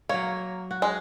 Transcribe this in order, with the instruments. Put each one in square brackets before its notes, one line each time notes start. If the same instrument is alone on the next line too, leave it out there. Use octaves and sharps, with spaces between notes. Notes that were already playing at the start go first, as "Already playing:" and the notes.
[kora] F#3 C#5 [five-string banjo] A#3
[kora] F#4
[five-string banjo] G#3